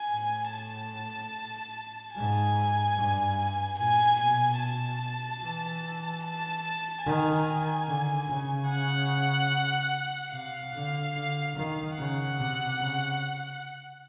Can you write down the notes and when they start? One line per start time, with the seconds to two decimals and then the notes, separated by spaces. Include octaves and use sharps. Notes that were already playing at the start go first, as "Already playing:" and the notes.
Already playing: G#5
0.11 A2
0.52 A5
2.15 G#2 G#5
2.97 G2
3.78 A#2 G#5
4.19 B2 G#5
4.61 A5
5.42 E3
6.24 A5
7.06 D#3 G#5
7.88 D3
8.28 C#3
8.70 F#5
10.33 C3 F5
10.74 D3
11.15 D3
11.55 D#3
11.97 C#3 F#5
12.38 C3
12.79 C#3